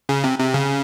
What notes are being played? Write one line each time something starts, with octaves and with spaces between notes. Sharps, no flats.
C#3
C3
C3
C#3